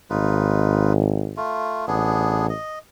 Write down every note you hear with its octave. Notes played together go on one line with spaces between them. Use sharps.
G#1 D#4 F4 B4
A3 F4
A1 B3 D4 G#4
D#5